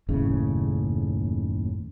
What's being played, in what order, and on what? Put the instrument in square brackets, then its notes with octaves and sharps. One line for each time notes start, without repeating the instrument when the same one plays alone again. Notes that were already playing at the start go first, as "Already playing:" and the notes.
[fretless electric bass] F#1 D#2 A2 C#3